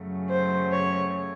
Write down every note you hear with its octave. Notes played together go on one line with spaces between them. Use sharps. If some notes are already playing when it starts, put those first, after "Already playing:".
Already playing: F#2 C#3 F#3 A3
C5
C#5